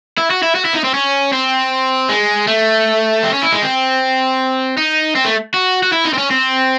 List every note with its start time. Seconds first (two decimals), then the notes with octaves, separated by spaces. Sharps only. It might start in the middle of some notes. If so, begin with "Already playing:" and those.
0.18 E4
0.30 F#4
0.43 E4
0.55 F#4
0.65 E4
0.75 D#4
0.84 C4
0.94 C#4
1.32 C4
2.09 G#3
2.47 A3
3.24 C4
3.33 C#4
3.43 E4
3.52 G#3
3.62 C4
4.77 D#4
5.16 C4
5.25 A3
5.54 F#4
5.83 F#4
5.92 E4
6.05 D#4
6.13 C4
6.18 C#4
6.31 C4